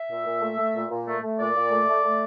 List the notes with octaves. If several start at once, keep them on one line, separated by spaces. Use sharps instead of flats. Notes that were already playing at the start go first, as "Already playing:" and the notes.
Already playing: E5
A#2
A#2
A3
A3
A#2
A#2
A3
A3
A#2 D5
A#2
A3
A3
A3